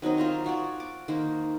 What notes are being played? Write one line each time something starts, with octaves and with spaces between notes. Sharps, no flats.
D#3 F#3 C4 D#4
F4 C5 A#5 C#6
F4 F#4 C#5 D5
D6
D#3 A#3 C5